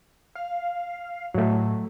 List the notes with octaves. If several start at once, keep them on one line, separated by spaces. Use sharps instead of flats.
F5
A2 F#3 A3